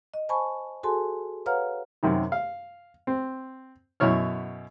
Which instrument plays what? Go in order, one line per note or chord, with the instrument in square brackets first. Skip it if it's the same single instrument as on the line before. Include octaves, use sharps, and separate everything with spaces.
[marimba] D#5
C5 G#5 A5 B5 C#6
F#4 G#4 A4 G#5 A5 C6
B4 C#5 F5 F#5 A#5 F6
[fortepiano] F#2 C3 D#3
F5
C4
F#2 B2 E4 C#5 F6